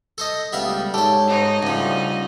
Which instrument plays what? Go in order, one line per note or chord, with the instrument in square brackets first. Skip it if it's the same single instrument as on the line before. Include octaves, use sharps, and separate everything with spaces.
[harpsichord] A4 C5 D#5
[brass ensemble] C#2 G3 A3 [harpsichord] B3 E5 F5
[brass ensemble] G#2 C#5 [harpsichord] G4 C5 [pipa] A4
[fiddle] D#4 D#5
[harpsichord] D2 F3 [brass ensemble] C#3 G3